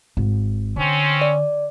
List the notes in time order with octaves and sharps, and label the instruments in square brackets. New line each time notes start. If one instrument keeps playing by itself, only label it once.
[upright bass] G#1
[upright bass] D3 [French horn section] C4 C#4
[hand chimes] D5